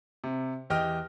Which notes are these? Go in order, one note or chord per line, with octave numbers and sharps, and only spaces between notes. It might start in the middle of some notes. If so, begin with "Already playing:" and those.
C3
E2 G4 D#5 G5 F6